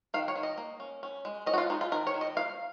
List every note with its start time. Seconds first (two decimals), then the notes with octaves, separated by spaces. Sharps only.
0.14 D#3 F5
0.28 C#5
0.36 D#3
0.43 D#5
0.58 A#3
0.80 C#4
1.03 C#4
1.25 G#3
1.46 C#4 D#5
1.54 F#4
1.58 F4
1.70 G#3 D#4
1.81 F4
1.92 D#3 A#4
2.07 C#5
2.14 D#3
2.21 D#5
2.36 A#3 F5